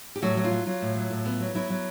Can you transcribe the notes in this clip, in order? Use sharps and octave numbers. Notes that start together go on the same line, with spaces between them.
G4
A2 F#3 F#4
F#3
F4
F#3
F#3 F4
A2
F#3
A2
B3
F#3
F#3 E4
F#3